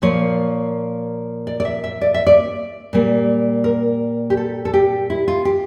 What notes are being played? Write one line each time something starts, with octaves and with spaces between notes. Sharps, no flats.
A#2 F3 A#3 C#5
D5
D5
E5
E5
D5
E5
D5
A#2 G3 A#3
A#4
G4
A4
A4
G4
E4
F4
G4